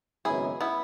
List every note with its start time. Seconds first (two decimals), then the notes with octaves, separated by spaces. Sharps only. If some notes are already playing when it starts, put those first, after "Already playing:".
0.25 G#1 F#2 C#3 G#3 B3 E4 G#4
0.61 B3 E4